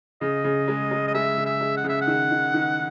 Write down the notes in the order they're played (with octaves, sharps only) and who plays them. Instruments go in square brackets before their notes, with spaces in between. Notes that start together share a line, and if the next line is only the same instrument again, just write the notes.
[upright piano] C#3 [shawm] D#5
[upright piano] C#3
G#3
G#3
[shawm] D#5
[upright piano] G#3 [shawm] E5
[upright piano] C#3
[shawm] E5
[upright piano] G#3
[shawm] F#5
[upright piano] C#3
[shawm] E5
F#5
[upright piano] D#3
D#3
D#3